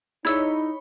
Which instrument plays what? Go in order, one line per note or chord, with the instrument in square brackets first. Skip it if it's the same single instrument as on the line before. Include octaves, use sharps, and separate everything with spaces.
[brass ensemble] D#4 [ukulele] E4 G#4 D5 [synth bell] C#5 B5 [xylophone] E6 G#6